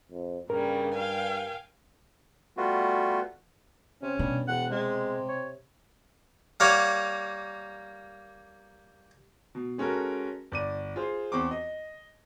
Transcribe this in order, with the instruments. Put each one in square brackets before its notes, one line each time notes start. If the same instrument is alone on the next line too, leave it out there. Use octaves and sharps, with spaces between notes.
[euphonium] F2
[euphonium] G2 [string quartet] C#3 G3 A#3 [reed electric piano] A#4
[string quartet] F5 G5 G#5
[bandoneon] G3 A3 B3 F4 F#4
[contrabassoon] C3 [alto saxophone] C#4
[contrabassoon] G2 [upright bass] B2
[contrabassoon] E1 [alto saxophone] F#5
[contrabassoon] C3 [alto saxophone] G#3
[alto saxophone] C#5
[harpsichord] G3 A#3 A#4 C#5 F5 F#5
[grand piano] B2
G#3 C#4 F#4 A4 A#4
G1 D5 D#7
F4 G#4 C5
E2 C4 C#6 D6
D#5